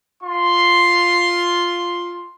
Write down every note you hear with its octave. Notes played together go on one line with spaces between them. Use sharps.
F4 C6